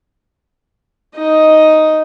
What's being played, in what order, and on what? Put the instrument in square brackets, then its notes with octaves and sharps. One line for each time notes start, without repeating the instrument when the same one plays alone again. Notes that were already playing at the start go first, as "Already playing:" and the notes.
[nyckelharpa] D#4 D#5